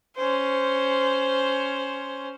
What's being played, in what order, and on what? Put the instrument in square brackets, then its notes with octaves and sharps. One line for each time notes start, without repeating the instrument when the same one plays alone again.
[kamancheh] C#4 C5